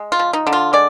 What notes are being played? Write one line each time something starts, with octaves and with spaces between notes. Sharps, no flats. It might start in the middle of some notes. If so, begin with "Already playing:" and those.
Already playing: G#3
F4
F3
D#4
D3
F4
G#3 D5